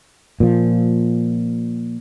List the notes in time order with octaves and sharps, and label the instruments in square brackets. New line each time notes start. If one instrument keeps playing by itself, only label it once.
[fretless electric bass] A#2 F3